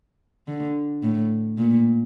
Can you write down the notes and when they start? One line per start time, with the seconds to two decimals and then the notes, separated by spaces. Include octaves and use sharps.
0.48 D3
1.03 A2
1.58 A#2